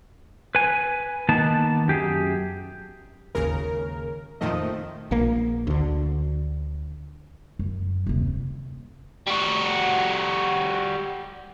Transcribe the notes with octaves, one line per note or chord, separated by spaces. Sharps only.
B4 G#5
D#3 A#3 B3 A5
F#2 G4 G#4
G#1 D#2 C#3 A#4
F2 A#2 D#3 F3 A3 D#5
A#1 A#3
D2 D3
F#2
D#1 C3
G3 F#4